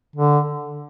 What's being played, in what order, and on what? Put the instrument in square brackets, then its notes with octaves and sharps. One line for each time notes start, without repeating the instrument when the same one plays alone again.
[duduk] D3